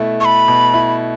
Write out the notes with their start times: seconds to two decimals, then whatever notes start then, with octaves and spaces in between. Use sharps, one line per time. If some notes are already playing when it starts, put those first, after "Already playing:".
Already playing: B2 A3 E4
0.20 A4 C#6
0.25 B5
0.48 B2
0.74 E4